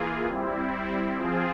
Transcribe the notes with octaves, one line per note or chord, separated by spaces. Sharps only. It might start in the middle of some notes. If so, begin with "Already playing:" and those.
Already playing: E3 A#3 F4 G#4
G3 C4 E4
F3 C4 F4 G#4